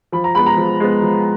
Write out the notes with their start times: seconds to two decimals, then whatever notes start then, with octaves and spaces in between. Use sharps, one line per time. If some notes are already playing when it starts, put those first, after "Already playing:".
0.12 F3 B5
0.24 A#5
0.35 G#3 B3 B5
0.46 A#5
0.57 F3
0.80 G#3 B3
1.02 F3